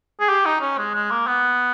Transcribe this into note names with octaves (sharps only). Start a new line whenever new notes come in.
G#4
G4
D#4
C#4
G#3
G#3
A#3
B3